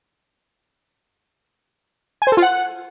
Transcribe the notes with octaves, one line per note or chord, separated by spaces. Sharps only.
G#5
C5
A4
F4
F#5